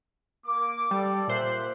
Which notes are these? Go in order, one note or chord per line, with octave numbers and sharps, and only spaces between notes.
A#3 D6
G3 A4 D5
A#2 C5 E5 F#6